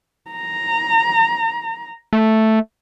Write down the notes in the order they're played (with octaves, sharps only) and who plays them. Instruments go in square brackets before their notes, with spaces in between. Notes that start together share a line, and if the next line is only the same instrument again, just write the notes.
[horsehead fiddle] A#5
[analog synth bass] A3